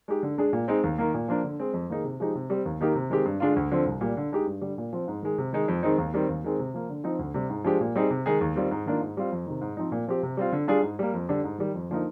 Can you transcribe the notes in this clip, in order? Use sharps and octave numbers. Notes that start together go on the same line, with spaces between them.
G#3 D#4 G4
D3
G#3 D4 G#4
A#2
G#3 C4 D#4
D#2
D#3 A#3
A#2
F3 A#3 D4
D3
G#3 C4
F2
D#3 A#3 D#4 G#4
C3
F3 G#3 D#4 G4
C3
G3 C4 G4
D#2
D#3 A#3 D#4 G4
C3
D#3 G#3 C4 G4
G2
D3 G#3 D4 F4
D2
D3 F3 C4
C2
A#2 G3
D3
G#3 D#4 G4
G2
D3 G3
A#2
F3 C4
G#2
D#3 G#3
C3
D#3 G#3 D#4
F2
D#3 G#3 C4 D#4
D#2
D#3 G3 C4
D#2
D#3 G#3 C4
C3
F3 A#3
D3
F3 C4 D#4
D2
C3 G3
G#2
F3 G#3 D4 G4
A#2
G3 C4 D#4 G#4
C3
D#3 G#3 D#4 G#4
D#2
D#3 G3 C4 F4
G#2
D#3 A#3 D4 F4
G#2
G3 C4 F4
F2
C3 D#3
G#2
F3 C4 D#4
A#2
F3 C4 G4
C3
G3 C4 F4
D3
G3 D4 F4 G#4
G#2
G3 A#3
F2
D3 G3 D4 G4
G#2
D#3 G3
F2
D3 F3 A#3 D#4